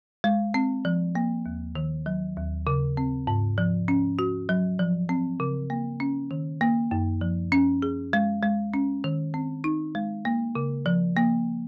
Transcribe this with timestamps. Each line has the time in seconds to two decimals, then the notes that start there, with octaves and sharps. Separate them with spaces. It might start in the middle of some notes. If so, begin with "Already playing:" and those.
0.24 G#3
0.54 C4
0.85 F3
1.15 A#3
1.46 D#2
1.75 D#3
2.06 F#3
2.37 D#2
2.67 C#3
2.97 C4
3.27 G#2
3.58 F3
3.88 C#4
4.19 F#4
4.49 F#3
4.79 F3
5.09 C4
5.40 C#3
5.70 A#3
6.00 C#4
6.31 D#3
6.61 A#3
6.91 F#2
7.21 F3
7.52 C#4
7.82 G#4
8.13 G#3
8.43 G#3
8.74 C#4
9.04 D#3
9.34 C4
9.64 D#4
9.95 G#3
10.25 A#3
10.55 C#3
10.86 F3
11.17 A#3